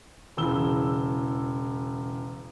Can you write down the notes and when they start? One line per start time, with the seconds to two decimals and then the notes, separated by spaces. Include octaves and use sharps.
0.37 E1 C#3 E3 E6 G7